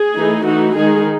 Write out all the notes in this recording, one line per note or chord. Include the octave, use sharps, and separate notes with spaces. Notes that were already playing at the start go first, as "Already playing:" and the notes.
Already playing: G#4
E3 A3 D#4
E3 A3 D#4 F#4
D#3 G#3 D#4 G#4